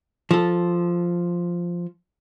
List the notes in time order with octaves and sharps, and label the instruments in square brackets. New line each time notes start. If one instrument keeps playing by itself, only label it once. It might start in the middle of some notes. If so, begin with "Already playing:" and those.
[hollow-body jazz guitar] F3 A4